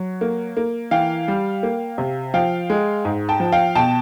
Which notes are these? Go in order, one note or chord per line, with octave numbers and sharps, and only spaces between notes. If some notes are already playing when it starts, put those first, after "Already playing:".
Already playing: F#3
A#3
A#3
E3 F5 G5
G3
A#3
C3
F3 F5 G5
G#3
G#2
G5 A5
F3
F5 G5
B2 G5 A5